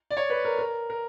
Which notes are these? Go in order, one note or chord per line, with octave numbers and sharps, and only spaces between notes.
D5
C#5
B4
A#4
A#4
A#4